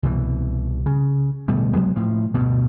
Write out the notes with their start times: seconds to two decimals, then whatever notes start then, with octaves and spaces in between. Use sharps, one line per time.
0.03 C2 B2 E3
0.86 C#3
1.48 D1 B2 G3 A3
1.73 C2 F#3 G#3 B3
1.96 A2 F3
2.34 D2 G2 B2